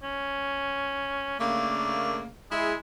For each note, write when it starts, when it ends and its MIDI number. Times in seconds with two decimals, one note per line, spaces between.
0.03 1.36 61
1.40 2.27 49
1.40 2.27 57
1.40 2.27 58
1.40 2.18 62
2.51 2.76 56
2.51 2.74 64
2.51 2.74 68